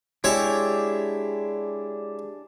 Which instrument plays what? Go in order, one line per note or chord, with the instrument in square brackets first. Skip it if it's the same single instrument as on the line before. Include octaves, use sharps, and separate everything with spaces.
[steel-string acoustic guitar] G#3 G4 G#4 [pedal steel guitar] D4 [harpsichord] E4 C#5 E5